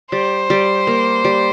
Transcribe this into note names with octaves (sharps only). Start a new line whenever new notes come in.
G3 C5
G3
A#3
G3